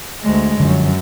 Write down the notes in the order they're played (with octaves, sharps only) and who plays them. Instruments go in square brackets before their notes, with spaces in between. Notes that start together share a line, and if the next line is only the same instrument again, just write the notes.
[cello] D2 G#3
[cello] F#2 [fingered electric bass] D3 F3